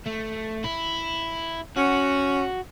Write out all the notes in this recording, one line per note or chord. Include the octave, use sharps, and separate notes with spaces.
A3
E4
C#4 F#4